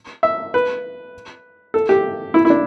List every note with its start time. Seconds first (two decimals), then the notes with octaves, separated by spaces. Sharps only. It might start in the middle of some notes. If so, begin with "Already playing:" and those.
0.23 E5
0.54 B4
1.74 A4
1.89 G4
2.34 E4
2.45 E4
2.50 D4